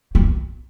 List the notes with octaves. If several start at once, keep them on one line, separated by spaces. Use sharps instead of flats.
A#3